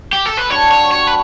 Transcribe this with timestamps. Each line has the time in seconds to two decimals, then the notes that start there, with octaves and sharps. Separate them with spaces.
0.13 G4
0.26 A4
0.37 B4
0.49 G3 D4 F#4 A4 C#5
0.71 C#5
0.91 G3 D4 F#4 A4 C#5
1.07 B4